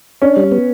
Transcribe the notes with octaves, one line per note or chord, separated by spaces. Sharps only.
C#4 D4
G3
B3